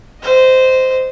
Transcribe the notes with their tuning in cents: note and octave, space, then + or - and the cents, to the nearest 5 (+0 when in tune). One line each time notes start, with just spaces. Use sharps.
C5 -15 D#5 +0